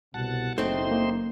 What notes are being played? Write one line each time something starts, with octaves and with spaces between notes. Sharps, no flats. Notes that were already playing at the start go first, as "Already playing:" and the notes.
C2 B2 F#5 A5
F#1 A3 C4 D#4 C5 C6
A#3